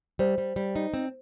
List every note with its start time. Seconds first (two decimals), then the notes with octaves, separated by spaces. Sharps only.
0.19 G3 C5
0.38 G3
0.56 G3
0.76 D#4
0.94 C4